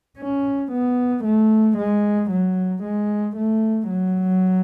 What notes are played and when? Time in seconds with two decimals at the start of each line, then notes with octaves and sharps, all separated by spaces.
0.18 C#4
0.72 B3
1.25 A3
1.77 G#3
2.30 F#3
2.83 G#3
3.36 A3
3.89 F#3